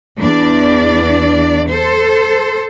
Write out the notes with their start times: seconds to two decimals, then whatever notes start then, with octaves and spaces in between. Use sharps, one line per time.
0.19 E2 D4 D5
1.69 A4 C5